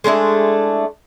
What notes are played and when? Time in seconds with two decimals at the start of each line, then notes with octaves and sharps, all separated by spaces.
0.04 G#3 A3 D4 E4